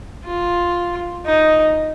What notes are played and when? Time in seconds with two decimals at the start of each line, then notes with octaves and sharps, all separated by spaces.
0.25 F4
1.26 D#4